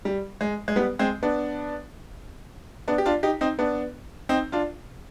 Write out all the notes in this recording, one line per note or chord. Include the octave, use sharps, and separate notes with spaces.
G3
G#3
G#3
G3 B3
G#3 C4
B3 D4
B3 D4
G4
D4 F4
D#4 G4
C4 D#4
B3 D4
C4 D#4
D4 F4